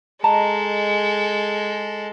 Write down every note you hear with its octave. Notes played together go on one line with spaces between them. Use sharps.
G#3 A4 D#5 A5 A#5